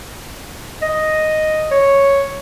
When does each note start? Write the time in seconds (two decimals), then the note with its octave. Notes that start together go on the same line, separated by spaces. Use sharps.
0.82 D#5
1.72 C#5